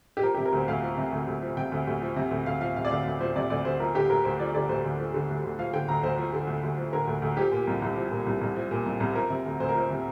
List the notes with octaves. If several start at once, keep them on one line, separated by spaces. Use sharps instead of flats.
G4
F3 A#4
G4
C3
A#4
D2 C5
D2 F5
F3
C3
D2
D2
F3
C3 G5
D2
D2
F3
C3
D2
D2 F5
F3 F5
C3 F5
D5
D2 F5
D2
F3 C5
C3 D5
D2 D5
D2 C5
F3 A#4
D3 G4
D2 A#4
D2 C5
F3 D5
D3 D5
D2 C5
D2
F3
D3
D2
D2
F3 F5
D3 G5
D2 A#5
D2 C5
F3
D3
D2
D2
F3
D3 A#4
D2
D2
F3 G4
A#2
C2
C2
F3
A#2
C2
C2
F3
A#2
C2
C2
F3 A#4
C3
D2
D2 C5
A#4
F3 C5
C3